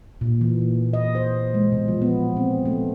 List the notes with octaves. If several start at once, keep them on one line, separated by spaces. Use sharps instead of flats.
A#2
E3
D#5
C5
G#3
B2
F3
B3
C4
A3